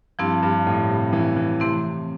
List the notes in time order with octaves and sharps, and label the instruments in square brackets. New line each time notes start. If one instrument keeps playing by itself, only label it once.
[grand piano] G2 [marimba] F3 C4 E4 G4
[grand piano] G2
A2
C3
E3
E3
[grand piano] C3 [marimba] E3 A3 C4 E4